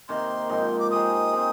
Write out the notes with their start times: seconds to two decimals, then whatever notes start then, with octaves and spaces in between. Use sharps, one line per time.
0.08 C3 D#3 A#3 C6
0.49 G#2 F3 C4 D#4
0.79 D6
0.91 G#3 D#4 G4 C5 D#6
1.32 G#3 C4 D#4